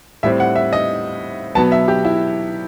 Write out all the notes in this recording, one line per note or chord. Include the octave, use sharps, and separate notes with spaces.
A2 G3 C4 E5
F#5
E5
D#5
B2 F#3 B3 A5
E5
G4
E4